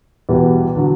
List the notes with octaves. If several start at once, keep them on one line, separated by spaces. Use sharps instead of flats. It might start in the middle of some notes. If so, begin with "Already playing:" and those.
E2 B2 G3 B3
D3 F#3